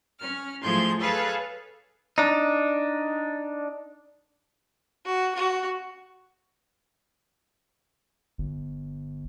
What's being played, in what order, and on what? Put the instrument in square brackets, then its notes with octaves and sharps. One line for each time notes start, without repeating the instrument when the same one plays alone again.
[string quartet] C#4 F6
A2 F3 G#4 C6 G6 G#6
G#4 A4 B4 C#5 F5 F#6
[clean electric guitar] D4 D#4
[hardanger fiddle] F#4
F#4
[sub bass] G1